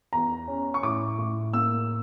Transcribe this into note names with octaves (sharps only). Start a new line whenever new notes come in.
E2 A#5
C#4
C#6
A2 D6
A2
A#3 E6